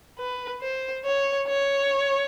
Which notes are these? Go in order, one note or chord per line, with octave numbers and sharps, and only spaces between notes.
B4
C5
C#5
C#5